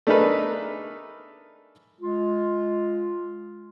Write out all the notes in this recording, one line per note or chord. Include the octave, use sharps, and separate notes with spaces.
A3 D4 D#4 G#4 A#4 B4
G#3 F4